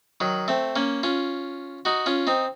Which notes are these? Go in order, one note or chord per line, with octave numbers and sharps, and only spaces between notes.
D#3 F#3
A3 C4
A#3 C#4
C#4 F4
D#4 F#4
C#4 F4
C4 D#4